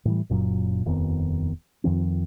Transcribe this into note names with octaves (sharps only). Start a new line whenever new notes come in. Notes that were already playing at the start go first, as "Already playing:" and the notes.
A2 E3 G3
F#1 F#2 A#2 F#3
D#1 F2 D#3 B3
F2 D#3 F3 C4